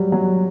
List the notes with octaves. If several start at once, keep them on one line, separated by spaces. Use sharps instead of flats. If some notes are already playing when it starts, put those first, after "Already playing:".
Already playing: F#3 G3
F#3